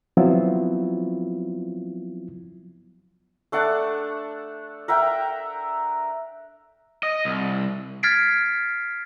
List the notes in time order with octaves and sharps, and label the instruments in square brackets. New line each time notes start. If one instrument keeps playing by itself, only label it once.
[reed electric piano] F3 F#3 B3 C4 E4 F4
[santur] A3 D4 F#5 A5
A#4 E5 F#5 G5
[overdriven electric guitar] D#5
C2
[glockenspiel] F6 G#6 A6 B6 C7 D7